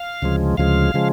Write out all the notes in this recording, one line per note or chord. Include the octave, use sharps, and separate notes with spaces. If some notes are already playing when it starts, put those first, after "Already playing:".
Already playing: F5
D2 C#3 F3 G#3
D2 C#3 F3 G#3 F5
C#3 F3 G#3